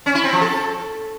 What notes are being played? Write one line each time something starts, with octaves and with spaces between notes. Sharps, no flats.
C#4
E4
C4
F3
A4